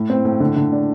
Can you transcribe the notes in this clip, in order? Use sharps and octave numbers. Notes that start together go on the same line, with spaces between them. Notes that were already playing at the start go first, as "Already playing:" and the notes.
Already playing: A2
C4
A2
D3
D3
D4